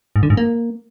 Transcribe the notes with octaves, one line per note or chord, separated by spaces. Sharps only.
G#2
D3
G#2
A#3